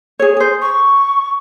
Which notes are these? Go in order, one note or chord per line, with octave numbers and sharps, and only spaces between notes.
G#4 C#5
G#4 C5
C#6